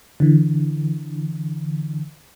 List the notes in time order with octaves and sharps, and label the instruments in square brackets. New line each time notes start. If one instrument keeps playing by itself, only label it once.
[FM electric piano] D3 E3